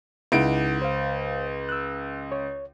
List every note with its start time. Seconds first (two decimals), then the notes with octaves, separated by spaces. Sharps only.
0.32 C#2 D#4 E4 F#5 D7
0.82 C5 F5
1.69 E6 F#6
2.32 C#5